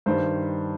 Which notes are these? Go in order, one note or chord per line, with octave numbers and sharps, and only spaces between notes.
G2 D#3 G3 C5